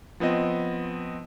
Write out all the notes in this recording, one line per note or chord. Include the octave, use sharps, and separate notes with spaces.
F3 B3 C4 D#5